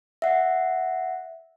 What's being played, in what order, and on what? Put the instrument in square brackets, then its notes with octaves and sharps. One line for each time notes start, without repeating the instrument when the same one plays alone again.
[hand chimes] E5 F#5